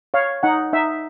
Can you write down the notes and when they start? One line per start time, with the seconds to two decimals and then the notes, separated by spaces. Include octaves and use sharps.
0.14 C#5 F5
0.43 D#4 F#5
0.73 D#4 E5